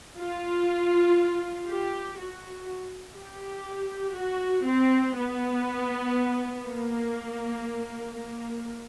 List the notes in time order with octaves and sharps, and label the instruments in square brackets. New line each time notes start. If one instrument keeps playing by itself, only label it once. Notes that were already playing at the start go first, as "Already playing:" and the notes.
[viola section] F4
G4
F#4
G4
F#4
C4
B3
A#3
A#3